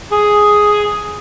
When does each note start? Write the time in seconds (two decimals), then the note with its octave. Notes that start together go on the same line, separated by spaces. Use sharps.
0.12 G#4